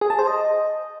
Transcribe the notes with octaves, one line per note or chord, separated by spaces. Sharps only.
G#4
A5
C5
D#5